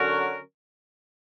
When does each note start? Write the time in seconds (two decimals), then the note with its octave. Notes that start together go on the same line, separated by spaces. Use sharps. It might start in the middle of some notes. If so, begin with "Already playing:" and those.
Already playing: D3 F#3 C#4 F#4 A#4